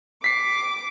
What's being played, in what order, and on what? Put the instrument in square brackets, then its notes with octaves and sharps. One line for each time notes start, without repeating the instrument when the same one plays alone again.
[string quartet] D6 [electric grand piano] B6 C7